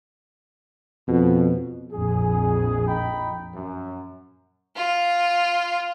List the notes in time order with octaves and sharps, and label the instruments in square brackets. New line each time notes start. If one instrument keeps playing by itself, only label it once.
[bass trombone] F2 [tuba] B2
[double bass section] A#1 F2 [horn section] G#4
[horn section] D#4 G5 B5
F#2
[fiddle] F4